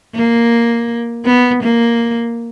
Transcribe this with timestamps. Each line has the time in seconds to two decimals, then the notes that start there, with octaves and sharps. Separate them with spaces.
0.15 A#3
1.25 B3
1.63 A#3